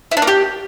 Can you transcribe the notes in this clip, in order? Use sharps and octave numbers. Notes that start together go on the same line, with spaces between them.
E4
D4
A#3
G4